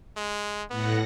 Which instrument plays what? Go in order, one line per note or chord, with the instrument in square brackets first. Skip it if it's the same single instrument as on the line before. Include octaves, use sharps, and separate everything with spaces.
[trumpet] G#3
[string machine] A2 F#5 A#6 [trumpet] B3